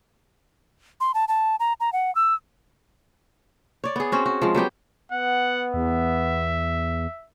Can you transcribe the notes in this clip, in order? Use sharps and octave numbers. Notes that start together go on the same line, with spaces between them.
C6
A5
A5
A#5
A#5
F#5
E6
C#5 D5
B3 G#4
C4 C#4 F#4
F#4
F3 G#3
F#3 B3 G4 G5
B3 F#5
E2 E5